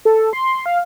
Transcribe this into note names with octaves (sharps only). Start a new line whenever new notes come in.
A4
C6
F5